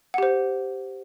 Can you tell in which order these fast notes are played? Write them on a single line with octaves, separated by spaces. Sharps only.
F#5 G4 C5